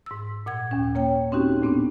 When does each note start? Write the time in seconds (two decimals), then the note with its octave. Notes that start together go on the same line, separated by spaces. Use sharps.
0.06 G#2 E6
0.46 A#2 F#5 G#6
0.71 D#2 C#4
0.95 A#3 C#5 G5
1.32 C4 C#4 D#4 F#4 G4
1.62 A2 A3 B3 C4 D4